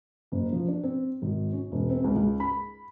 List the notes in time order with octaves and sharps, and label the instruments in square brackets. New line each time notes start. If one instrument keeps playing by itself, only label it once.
[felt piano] F#1
F3
D4
C4
G#1
C#4
E1
C4
C#2
C#2
B5